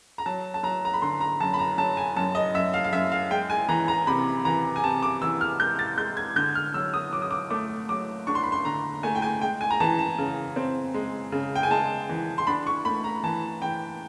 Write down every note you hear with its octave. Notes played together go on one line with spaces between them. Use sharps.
A#5
F#3 A5
A5
F#3 A#5
A#5
B5
D3 C6
A#5
F#2 A5
B5
A#5
F#3 A5
G#5
F#2 A5
D#5
F#2 E5
F5
F5
F#2 E5
F5
G#3 G5
G#5
E3 A#5
A#5
C3 B5
E3 A#5
G#5
C3 A5
D6
E3 E6
F6
G#3 G6
A6
G#3 G6
G#6
D3 G6
F6
F#3 E6
D#6
F#3 D6
D#6
D6
A3 D6
F#3 D6
D4 C#6
C6
B5
C6
D3 A#5
A3 G#5
G5
G#5
G#3 G5
G#5
A#5
E3 A5
A5
C#3
C4
G#3
C#3
G5
G#5
G#3 A5
E3
C6
D4 B5
C#6
A3 B5
A#5
E3 A5
E3 G5